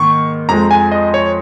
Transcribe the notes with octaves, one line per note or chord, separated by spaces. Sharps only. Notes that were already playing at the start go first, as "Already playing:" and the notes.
Already playing: G#2 D#3 A#3 C#6
F2 F3 G#3 A#5
G#5
D#5
C#5